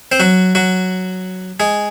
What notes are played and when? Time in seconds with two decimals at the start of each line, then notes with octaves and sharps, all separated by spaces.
0.12 C4 C5
0.20 F#3 F#4
0.55 F#3 F#4
1.60 G#3 G#4